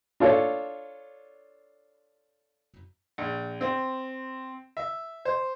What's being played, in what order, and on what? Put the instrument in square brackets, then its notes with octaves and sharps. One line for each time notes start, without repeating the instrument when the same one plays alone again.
[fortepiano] D4 F4 A4 C#5
[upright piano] A#1
C4
E5
C5